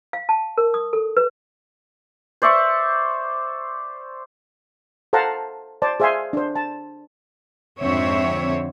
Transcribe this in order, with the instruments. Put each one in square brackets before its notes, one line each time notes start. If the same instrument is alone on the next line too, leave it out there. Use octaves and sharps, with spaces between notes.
[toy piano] F5
A5
A#4
D#6
A4
B4
[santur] C5 D5 E5 C#6
[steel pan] A4 C5 F5 F#5 A5 A#5
C5 D5 A5
G#4 C5 E5 F5 G#5 C6
D4 C5
A5
[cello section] F2 G#2 D3 C4 C#5 E5